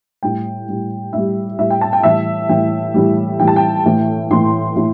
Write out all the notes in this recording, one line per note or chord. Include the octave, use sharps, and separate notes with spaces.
A2 G3 G5
A2 G3
A2 G3 E5
A2 G3 E5
G5
A5
G5
A2 E3 G3 E5
A2 E3 G3 G5
A2 E3 G3
A2 E3 G3 G5
A5
G5
A2 E3 A3
A2 E3 A3 C6
A2 E3 A3